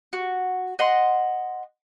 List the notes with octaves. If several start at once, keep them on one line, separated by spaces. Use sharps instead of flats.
F#4
D#5 F#5 C6